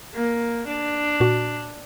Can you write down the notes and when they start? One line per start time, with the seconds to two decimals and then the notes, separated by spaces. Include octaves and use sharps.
0.14 A#3
0.67 D4
1.20 A#2 F#4